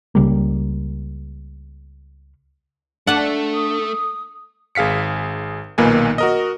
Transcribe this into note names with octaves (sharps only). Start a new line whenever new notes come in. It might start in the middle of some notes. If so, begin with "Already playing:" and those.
C#2 C#3 G3 A#3
A3 D4 F#5 A5
D#6
G#1 G#4 F5 B6 C#7
B1 A#2 D#3 A#3 B4 G#5
F#4 A#4 D#5